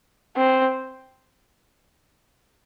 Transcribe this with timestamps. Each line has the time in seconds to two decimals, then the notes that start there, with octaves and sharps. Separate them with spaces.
0.37 C4